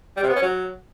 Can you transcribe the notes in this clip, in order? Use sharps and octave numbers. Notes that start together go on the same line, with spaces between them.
G3
C3
B3
C#4
F#3